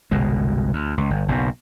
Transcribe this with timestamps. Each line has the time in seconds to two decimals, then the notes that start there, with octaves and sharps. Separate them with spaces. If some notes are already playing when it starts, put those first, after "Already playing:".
0.11 G1 C2 B2 G#3
0.73 D2
0.97 C#2
1.10 G1
1.28 F#1 B1 B2